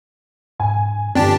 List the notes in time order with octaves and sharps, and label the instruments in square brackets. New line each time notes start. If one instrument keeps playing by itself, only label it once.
[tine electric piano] G#2 [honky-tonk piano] G#5
[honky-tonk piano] G1 [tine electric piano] C4 [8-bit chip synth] D4 G4 A5